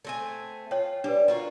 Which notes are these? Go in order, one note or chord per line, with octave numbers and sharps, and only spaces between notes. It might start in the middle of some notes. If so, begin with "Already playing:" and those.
A3 C4 G#5
F4 C#5 G5
G3 D4 B4
F4 F#4 A#4